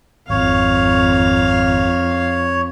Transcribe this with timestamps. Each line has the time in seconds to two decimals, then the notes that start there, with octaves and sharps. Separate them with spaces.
0.30 G#1 F2 C#5 F5